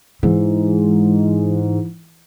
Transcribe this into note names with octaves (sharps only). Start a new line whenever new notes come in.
G#2 E3